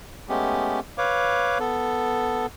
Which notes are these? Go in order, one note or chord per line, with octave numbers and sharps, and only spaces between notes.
G#3 A3 B3 C#4 G4
B4 C#5 F5 D6
B3 A4